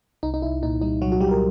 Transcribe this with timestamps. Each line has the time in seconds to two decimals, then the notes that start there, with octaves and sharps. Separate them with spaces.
0.23 C2 D#4
0.34 D#4
0.42 C2 E4
0.63 A#2 D#4
0.81 G3 D#4
1.02 C2 F#3 F#4
1.12 F#4
1.21 C2 G3 G4
1.31 A#4